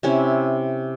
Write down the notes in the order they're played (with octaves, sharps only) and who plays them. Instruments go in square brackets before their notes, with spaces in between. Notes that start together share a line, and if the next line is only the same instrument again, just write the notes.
[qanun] C3 C#4 E4